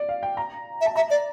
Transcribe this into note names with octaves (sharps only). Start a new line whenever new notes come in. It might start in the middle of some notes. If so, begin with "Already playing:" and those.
Already playing: D5
F5
G5
A#5
E5
A5
E5 A#5
D5